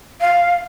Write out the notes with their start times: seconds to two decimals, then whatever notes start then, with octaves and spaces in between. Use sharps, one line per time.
0.21 F5